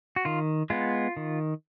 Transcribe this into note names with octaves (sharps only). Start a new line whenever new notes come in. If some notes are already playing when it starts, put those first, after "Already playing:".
F#4
D#3 F4
G#3 B3 F4
D#3